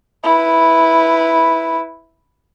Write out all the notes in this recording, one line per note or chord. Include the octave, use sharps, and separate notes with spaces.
E4 B4